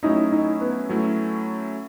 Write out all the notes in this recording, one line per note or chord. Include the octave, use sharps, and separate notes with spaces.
F#3 A3 C#4 D#4 E4
D#4
B3
F#3 A3 C#4 E4